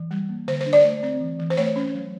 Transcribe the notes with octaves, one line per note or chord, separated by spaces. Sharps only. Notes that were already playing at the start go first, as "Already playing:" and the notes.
Already playing: E3
G3
A#3
D3 C5
C5
D4
D5
A3
C4
E3
E3
C5
A3 C#5
C#4
F#3